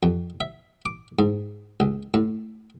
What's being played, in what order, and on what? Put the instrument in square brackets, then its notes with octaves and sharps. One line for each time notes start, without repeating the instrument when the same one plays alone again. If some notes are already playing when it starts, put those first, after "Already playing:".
[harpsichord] F2
E5
D6
G#2
C#2
A2